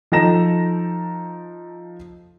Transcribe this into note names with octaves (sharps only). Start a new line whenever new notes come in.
F3 D#4 A4 A#5 A#6 E7